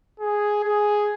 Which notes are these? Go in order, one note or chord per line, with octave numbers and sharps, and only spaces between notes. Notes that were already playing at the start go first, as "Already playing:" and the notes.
G#4
G#4